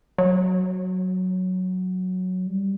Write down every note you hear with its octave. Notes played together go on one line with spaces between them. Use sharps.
F#3
G3